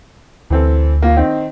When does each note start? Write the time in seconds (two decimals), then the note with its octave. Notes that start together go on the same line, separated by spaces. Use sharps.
0.50 D2 E3 C4 A4
1.02 A#3 F4
1.16 D#3 C4 D#4